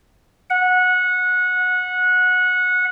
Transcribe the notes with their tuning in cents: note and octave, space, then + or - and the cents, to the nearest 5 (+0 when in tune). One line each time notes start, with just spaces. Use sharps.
F#5 -20